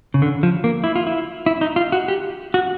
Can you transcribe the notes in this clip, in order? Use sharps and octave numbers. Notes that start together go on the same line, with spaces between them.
C#3
D3
F3
A#3
E4
F4
E4
E4
D#4
F4
F#4
G4
F#4